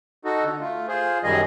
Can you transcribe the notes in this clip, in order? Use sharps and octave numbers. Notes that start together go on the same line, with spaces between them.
D#4 F#4 A4
D3
A3 F4
F4 G#4 C5
F#2 D#3 G3 G#4 D#5